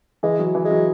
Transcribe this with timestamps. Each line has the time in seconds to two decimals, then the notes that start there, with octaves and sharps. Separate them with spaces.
0.23 E3 G#3
0.39 F#3
0.55 E3
0.65 G#3
0.71 F#3